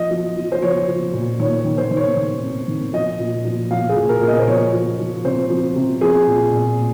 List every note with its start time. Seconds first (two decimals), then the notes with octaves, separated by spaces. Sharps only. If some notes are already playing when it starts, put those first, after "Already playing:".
Already playing: F3 D#5
0.11 F3
0.37 F3
0.52 C5
0.62 F3 C#5
0.88 F3
1.14 A#2
1.39 D#3 C#5
1.59 C#5
1.64 D#3
1.78 C5
1.90 D#3
1.97 C#5
2.16 D#3
2.42 C3
2.67 D#3
2.93 F3 D#5
3.19 A#2
3.45 F3
3.71 F3 F5
3.89 G#4
3.96 A#2
4.09 A#4
4.21 A#2
4.28 D#5
4.39 C5
4.47 F3 C#5
4.73 F3
4.99 F3
5.24 C3 C5
5.50 F3
5.76 C3
6.01 F3 G#4
6.27 A#2
6.52 A#2